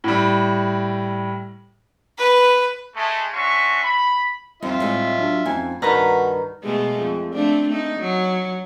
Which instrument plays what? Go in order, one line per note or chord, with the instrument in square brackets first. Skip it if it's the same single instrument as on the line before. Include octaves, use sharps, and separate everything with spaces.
[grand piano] A2 G3
[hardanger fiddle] B4
[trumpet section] G#3 A3
C#4 D4 F#4 E5 C6 C#6
B5
[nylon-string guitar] F2 [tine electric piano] G3 C4 D#4 [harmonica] F4 E5
[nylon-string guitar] A2 G#3
[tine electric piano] F#3 D4 F#4
[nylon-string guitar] F2 G#5 [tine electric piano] A3 C#4 D#4
[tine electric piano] C2 A5 [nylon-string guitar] G2 D#3 [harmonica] F#4 [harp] B4 A#5 F6
[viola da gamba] B2 G#3 A3
F2
A3 C4 D4
A3 D#4
F#3